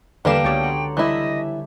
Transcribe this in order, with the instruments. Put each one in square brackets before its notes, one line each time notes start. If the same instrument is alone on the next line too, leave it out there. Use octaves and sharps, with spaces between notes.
[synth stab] E2 B4 E7 [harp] D3 [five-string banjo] G3 A#3 F5 [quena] G5
[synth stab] C#2 C#5 A5 [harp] B3 F#4 G4
[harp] F#5 A#5 C6
[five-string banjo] E3 E4 [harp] G3 E5 [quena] D#5